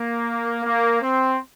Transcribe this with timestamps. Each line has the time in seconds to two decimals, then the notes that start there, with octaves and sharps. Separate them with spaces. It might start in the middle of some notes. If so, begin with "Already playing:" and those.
Already playing: A#3
0.64 A#3
1.01 C4